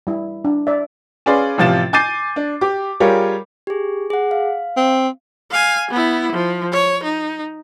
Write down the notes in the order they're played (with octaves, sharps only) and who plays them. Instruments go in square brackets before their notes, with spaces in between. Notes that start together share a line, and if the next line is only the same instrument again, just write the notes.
[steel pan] G3 E4
D4
D5 E5
[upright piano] C#4 G#4 B4 D5 F5 C6
A1 C3 F3 F4 A6 E7
G#5 D6 G6 A6 C7 D#7
D4
G4 D6
G3 F4 G4 G#4 A#4 C#5
[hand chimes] G4 G#4
G#4 F#5
F5
[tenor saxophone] C4
[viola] F5 G#5
B3 E4
F3
C#5
D#4